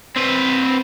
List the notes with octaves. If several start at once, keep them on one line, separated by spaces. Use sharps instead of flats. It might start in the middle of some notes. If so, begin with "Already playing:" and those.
C4 B4